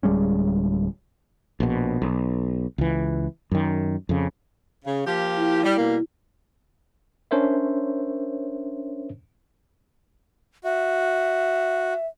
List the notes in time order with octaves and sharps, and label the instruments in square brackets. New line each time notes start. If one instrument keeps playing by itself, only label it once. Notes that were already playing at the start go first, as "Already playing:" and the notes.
[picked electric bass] D1 G3 G#3 C#4
[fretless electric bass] A#1 B2
B1
C#2 E3
F#2 D#3
F2 C#3
[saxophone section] C#3
F3 A#3 G4
[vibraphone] E4
[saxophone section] G3
B2 G3 A#3
[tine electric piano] C#4 D4 A#4 C5 C#5 E5
[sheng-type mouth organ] F#4 [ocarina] E5